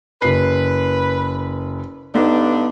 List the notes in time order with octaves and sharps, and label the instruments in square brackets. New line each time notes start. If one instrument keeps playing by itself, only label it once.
[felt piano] F#1 C7 [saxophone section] B4
[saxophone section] G2 D3 D4 [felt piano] B3 D#4